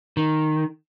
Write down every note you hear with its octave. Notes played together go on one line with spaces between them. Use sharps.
D#3